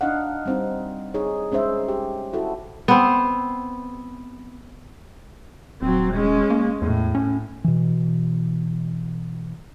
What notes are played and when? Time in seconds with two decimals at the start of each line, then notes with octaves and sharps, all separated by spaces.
0.01 D4 D#4 D#5 F5 F#5
0.46 G3 C4 D#4
1.14 D#4 G#4 C#5
1.52 G#3 C#4 D#4 C5 E5
1.88 G4
2.33 E4 F#4 A4
2.88 B3 C4
5.82 D#1 F#3 C4
6.14 G#3 C#4
6.50 A#3
6.82 E2 A2
7.15 C#4
7.64 B2 E3